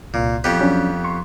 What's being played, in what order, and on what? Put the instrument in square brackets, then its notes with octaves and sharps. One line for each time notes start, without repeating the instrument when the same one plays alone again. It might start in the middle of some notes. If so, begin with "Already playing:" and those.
[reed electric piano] C2 [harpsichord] A#2
[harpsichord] F2 B3 G4
[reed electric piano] F#3 C#4 D4
C6 C#6